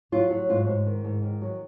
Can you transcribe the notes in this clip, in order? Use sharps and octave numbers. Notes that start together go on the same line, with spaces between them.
F#3 F4
F#3
G#2 F4
G#2
D#3
G#2
D#3
F#3